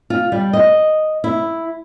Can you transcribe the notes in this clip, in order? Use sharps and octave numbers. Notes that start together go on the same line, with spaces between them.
F4
G3
D#5
E4